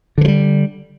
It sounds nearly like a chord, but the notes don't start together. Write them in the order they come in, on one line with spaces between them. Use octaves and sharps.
D3 E3 F3 G3